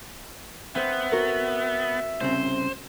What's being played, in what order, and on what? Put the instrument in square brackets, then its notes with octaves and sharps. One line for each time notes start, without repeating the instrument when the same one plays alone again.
[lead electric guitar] B3 [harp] C4 C5 [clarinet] E5
[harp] F#4 A#4
[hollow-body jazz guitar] C2 C#3 C4 [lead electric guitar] C5